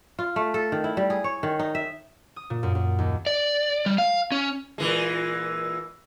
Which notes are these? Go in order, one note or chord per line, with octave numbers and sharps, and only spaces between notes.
F4
A3
A4
D#3
E4
G3
G#4
C#5
D#3
D#4
E5
D#6
A#2
F#2
F#2
D#2
D5
G3
F5
C#4
A#2 E3 G#3